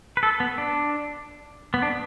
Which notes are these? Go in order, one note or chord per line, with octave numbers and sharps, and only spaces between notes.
B4
A4
B3
D4
B3
D4